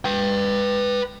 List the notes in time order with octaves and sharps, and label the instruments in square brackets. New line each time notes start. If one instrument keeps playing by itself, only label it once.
[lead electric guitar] B4 G5